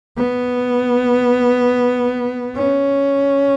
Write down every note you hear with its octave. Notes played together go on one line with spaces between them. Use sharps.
B3
C#4